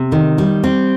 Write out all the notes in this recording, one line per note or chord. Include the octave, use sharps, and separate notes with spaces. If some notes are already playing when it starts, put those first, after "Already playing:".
Already playing: C3
D#3
G3
C4